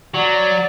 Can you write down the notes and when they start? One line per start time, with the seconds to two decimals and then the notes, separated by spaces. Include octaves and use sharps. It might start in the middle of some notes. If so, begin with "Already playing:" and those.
0.14 F#3 D5